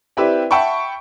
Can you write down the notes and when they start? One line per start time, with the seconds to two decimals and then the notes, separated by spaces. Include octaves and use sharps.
0.17 C4 E4 G4 B4 D5 E5
0.51 E5 F#5 G5 A5 B5 C#6